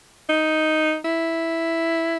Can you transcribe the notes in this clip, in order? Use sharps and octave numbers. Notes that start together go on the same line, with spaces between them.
D#4
E4